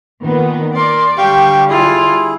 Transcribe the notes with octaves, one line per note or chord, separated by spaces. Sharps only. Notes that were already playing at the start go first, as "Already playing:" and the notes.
A#2 D#3 B3
A#4 D5 C6
D3 G3 G4 F5 G5 C#6
E4 F4 G#4